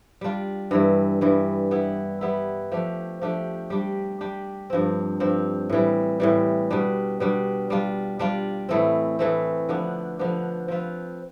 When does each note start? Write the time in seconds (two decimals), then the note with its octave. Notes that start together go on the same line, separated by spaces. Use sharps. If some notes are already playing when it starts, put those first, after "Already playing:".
0.21 G3 D4 F4
0.71 G2 E3 G3
1.21 G2 E3 G3
1.71 G3 B3 E4
2.21 G3 B3 E4
2.72 F3 A3 D4 G4
3.21 F3 A3 D4 G4
3.70 G3 D4 G4
4.21 G3 D4 G4
4.70 G2 F3 C4
5.20 G2 F3 C4
5.70 A2 E3 G3
6.20 A2 E3 G3
6.70 B2 G3 D4
7.20 B2 G3 D4
7.70 G3 D4 F4
8.19 G3 D4 F4
8.69 A2 E3 A3 C4
9.19 A2 E3 A3 C4
9.69 D3 F3 B3 D4
10.19 D3 F3 B3 D4
10.68 F3 C4 F4 B4